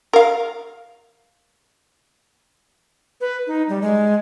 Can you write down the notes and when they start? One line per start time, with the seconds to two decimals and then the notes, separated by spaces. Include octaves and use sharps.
0.13 A#4 F5
3.21 B4
3.47 D#4
3.69 G3
3.82 G#3